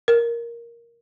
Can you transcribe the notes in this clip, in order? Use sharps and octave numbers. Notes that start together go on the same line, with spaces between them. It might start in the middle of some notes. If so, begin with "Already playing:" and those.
A#4